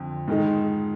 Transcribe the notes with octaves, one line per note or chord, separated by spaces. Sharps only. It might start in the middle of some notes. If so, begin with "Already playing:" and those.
Already playing: F2 D3 C4
G#2 D#3 G#3 D#4